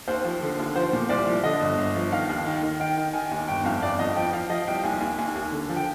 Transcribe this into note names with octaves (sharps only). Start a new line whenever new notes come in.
D#2 C5
F3
D3
D#2
F3 C5
A#2
C2 D5
F3
D3 D#5
G1
G1
F3
D#3 F5
D#2
D#3
D#3
D#3 G5
D#3
D#3 G#5
D#2
G1 G5
F2 F5
G1 D5
F2 D#5
F3 G5
F3 F5
F3 D#5
C2 G5
D#2 G#5
D#2
D#2 G#5
D#2
D3
F3
G5